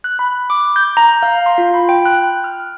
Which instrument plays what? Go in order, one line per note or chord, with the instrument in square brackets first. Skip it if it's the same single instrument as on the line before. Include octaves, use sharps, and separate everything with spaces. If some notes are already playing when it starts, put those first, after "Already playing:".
[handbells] F#6
B5
D6
G6
A#5
F5
C6
F4
B5
G5
F#6
F6